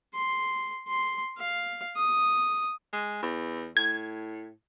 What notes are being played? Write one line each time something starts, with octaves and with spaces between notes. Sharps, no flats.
C6
C6
F5
D#6
G#3
E2
A2 G#6